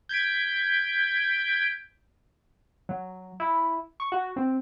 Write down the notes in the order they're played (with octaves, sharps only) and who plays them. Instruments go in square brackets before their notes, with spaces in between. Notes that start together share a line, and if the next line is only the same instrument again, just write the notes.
[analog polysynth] G6 G#6 B6 D7
[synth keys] F#3
E4
C#6
F#4
C4